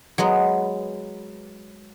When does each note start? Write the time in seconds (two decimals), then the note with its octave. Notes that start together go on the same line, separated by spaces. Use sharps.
0.18 F#3 G#3 B3